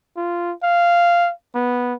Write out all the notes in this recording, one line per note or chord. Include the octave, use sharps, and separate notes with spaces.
F4
F5
B3